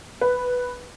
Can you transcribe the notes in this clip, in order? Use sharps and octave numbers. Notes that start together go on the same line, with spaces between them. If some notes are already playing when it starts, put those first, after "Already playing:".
B4